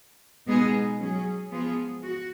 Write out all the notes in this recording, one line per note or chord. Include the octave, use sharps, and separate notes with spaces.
B2 G#3 B3 D#4 G#4
F#3 C#4 G#4
F3 G#3 B3 F4 G#4
F#4